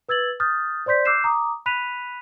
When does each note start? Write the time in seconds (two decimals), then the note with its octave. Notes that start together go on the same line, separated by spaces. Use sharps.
0.09 B4 E6 G#6 A6 F#7
0.40 D#6 F6 G6 A6
0.86 C5 D5 C6 G6 B6
1.05 D6 E6 F#6 G6 C7 E7
1.24 A#5 D6 D#6
1.66 B5 F#6 B6 D#7 F7